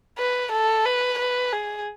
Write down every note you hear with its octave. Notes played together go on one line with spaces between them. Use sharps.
B4
A4
B4
B4
G#4